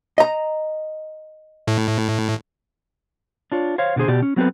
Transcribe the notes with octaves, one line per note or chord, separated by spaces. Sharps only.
D#5 A#5
A2
D4 F4 C#5
C5 C#5 F5
B2 D3 A3 G#4 C5
B2 G4 D5
C#4
F#3 B3 C4 G4 A4 B4